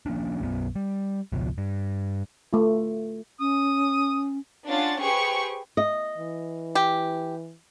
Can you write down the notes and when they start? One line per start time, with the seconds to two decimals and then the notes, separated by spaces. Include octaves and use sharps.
0.06 F3 A#3 C#4 D4
0.41 B1 F#2 E3 B3
0.75 G3
1.32 G#1 C#2 B2 F3
1.58 G2
2.53 A3 F4
3.40 C#4 D#6
4.67 C#4 D4 F4 F#5 A6
4.99 G4 G#4 B4 C5 C#6
5.77 D#5
6.18 E3
6.75 G4